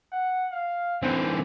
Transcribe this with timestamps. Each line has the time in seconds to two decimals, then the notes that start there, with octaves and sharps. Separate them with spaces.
0.12 F#5
0.52 F5
1.03 D3 E3 C4 C5